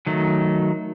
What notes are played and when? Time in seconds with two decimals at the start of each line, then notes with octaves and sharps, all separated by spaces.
0.07 D#3 F#3 A3